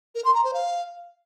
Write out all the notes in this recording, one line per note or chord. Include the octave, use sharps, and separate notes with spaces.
A#4
C6
A#5
C5
F5